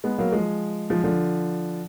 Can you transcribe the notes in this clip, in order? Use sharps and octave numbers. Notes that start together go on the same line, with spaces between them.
G#3 B3
F#3 A#3
F3 G#3
F3 G#3
D3 F3